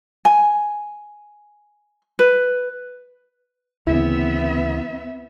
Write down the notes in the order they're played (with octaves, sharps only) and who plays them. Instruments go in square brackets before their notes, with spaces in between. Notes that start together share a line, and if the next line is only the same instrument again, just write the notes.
[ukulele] G#5
B4
[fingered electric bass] D2 C#3 E3 [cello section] B3 C4 E5 [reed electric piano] E4